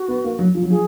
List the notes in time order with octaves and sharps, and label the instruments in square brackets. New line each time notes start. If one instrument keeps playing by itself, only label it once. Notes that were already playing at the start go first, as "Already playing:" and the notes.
Already playing: [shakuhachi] F#4
[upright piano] B3
A#3
F#3
F3
F#3
[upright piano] F3 [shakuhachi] G#4